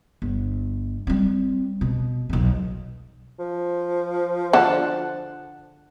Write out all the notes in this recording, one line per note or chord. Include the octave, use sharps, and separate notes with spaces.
G1
G3 C4
B2
B1 E2
F3
D3 F#5 A5